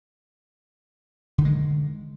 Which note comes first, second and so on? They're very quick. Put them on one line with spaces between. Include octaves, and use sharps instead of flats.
D3 D#3 G#3